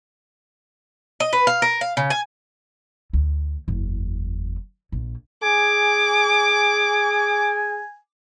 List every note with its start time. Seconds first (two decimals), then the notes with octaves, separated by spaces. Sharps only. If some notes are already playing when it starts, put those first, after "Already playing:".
1.20 D#5
1.33 B4
1.47 F5
1.62 A#4
1.81 F5
1.97 C#3
2.10 G#5
3.13 D2
3.68 F#1 E2
4.92 A#1
5.43 G#4 G#5 D6